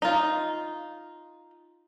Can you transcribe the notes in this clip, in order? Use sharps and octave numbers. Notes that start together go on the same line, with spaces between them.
D#4 F4